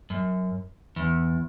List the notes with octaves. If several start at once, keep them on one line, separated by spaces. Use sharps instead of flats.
F#2
E2